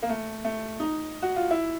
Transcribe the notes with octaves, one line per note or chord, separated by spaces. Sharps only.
A#3
A3
A3
D#4
F#4
F4
E4